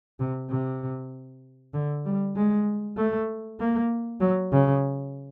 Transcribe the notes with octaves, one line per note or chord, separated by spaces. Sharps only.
C3
C3
D3
G3
G#3
A3
A#3
F#3
C#3